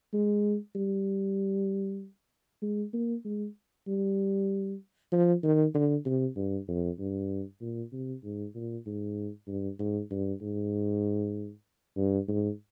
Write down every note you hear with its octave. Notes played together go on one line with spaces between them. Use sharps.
G#3
G3
G#3
A#3
G#3
G3
F3
D#3
D3
C3
G2
F2
G2
A#2
C3
G#2
A#2
G#2
G2
G#2
G2
G#2
G2
G#2